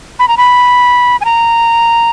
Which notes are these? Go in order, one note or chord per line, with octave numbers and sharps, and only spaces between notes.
B5
A#5
B5
G#5
A#5